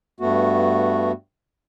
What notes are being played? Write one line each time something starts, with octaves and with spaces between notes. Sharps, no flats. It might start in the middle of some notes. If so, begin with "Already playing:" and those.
G2 A3 B3 F#4